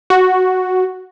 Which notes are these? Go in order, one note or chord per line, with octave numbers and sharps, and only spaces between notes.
F#4